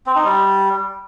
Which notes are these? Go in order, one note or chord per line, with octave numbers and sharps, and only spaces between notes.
C4
D#4
G3